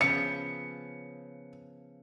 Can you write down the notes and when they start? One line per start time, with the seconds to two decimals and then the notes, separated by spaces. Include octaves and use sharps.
0.01 C#3 F3 B3 C#7